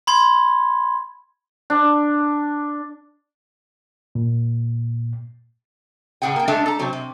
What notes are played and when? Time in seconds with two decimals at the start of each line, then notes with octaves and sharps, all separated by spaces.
0.07 B5 C6 G#6
1.70 D4
4.15 A#2
6.22 A2 C#3 G#4 F#5 G5
6.36 A#3 G5
6.48 G#3 A3 D4 A4 E5
6.66 A4 A#5
6.79 C3 F#3 C4
6.93 C3